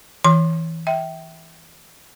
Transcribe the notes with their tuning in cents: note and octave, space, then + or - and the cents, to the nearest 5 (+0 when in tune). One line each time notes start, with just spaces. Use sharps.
E3 -15 C6 +25
E5 -10 G5 -15